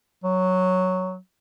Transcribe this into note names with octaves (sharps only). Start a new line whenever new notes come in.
F#3